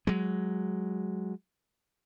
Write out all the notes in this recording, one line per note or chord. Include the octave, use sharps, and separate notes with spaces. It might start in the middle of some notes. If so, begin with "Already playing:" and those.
F#3 G#3